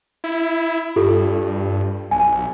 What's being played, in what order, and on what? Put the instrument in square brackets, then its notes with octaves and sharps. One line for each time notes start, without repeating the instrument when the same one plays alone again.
[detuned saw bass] E4
[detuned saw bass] G2 [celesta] F4 G4 A4
[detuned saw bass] B1 [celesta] G#5